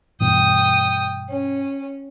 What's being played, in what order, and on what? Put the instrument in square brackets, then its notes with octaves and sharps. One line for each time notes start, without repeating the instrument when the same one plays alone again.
[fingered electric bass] G2 B2 E3 [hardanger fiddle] G5 D#6
[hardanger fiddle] C#4